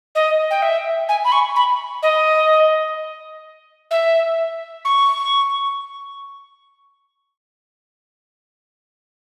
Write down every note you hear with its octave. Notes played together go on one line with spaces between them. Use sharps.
D#5
G5
E5
G#5
B5
C#6
B5
D#5
E5
C#6